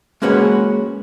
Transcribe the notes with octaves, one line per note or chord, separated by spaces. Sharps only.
G#3 A#3 C#4 F#4 B4 C#5